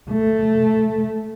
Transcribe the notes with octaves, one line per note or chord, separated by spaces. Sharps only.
A3